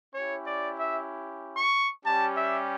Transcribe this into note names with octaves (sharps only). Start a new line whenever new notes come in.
C#4 E4 G4 C#5
D5
E5
C#6
G3 C#4 G4 A5
E5